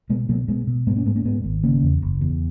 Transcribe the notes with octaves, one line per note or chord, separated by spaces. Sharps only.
B2 G#3 B3
B2 F#3 A#3
B2 G#3 B3
B2
G#2 G#3 B3
A#3 C#4
G#2 G#3 B3
A#3 C#4
G#2 G#3 B3
G#1
C#3 A#3 C#4
E2
F#1
E2